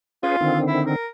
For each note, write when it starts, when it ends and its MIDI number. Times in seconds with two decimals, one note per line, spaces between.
0.23 0.37 61
0.23 0.59 65
0.23 0.37 68
0.23 0.37 71
0.41 0.96 50
0.41 0.96 51
0.41 0.96 60
0.68 0.81 64
0.87 1.07 70